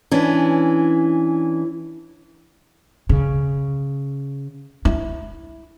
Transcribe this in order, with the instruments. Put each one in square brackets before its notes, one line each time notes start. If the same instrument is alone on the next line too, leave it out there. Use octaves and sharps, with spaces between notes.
[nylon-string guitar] E3 C#4 D4
[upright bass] C#3
E4